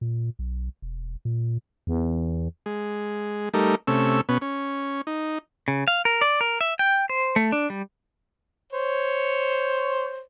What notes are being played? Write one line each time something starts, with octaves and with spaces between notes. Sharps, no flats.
A#2
B1
E1
A#2
E2
G#3
G3 A3 D#4 A#4
C3 A3 C#4 E6
B2 B3 C#4
C#4
D#4
C#3
F5
A#4
D5
A#4
E5
G5
C5
A3
D4
G3
C5 C#5